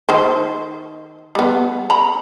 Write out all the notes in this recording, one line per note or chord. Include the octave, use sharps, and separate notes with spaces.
D#3 C5
G3 B3
A#5 B5